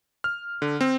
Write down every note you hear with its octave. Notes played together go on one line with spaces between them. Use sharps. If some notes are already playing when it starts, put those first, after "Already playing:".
F6
D3
C4